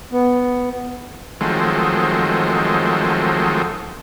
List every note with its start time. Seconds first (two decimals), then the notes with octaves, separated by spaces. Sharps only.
0.12 B3
1.41 D#3 F3 F#3 G#3 A3 C4